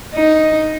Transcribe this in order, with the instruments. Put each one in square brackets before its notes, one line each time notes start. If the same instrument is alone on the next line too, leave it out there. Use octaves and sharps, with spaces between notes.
[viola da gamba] D#4